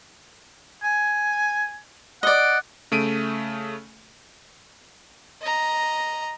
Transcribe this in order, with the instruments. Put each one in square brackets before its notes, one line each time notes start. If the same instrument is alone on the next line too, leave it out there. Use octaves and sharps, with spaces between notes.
[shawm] G#5
[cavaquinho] D5 D#5 [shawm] F#5
[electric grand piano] C#3 A3 D7 D#7
[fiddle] D#5 A#5